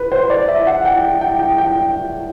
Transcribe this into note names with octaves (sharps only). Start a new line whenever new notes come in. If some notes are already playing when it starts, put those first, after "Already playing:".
Already playing: B4
C5
D5
E5
F#5
G5
G5
G5
G5